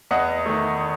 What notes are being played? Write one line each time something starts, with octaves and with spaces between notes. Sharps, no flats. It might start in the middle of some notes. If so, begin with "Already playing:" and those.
E2 D#5 F#5
D#3 A3